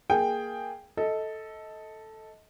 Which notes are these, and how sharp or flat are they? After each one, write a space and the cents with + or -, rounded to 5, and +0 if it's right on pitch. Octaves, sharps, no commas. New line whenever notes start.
A#3 +0 G#4 +0 G5 +5
A4 +0 D#5 +25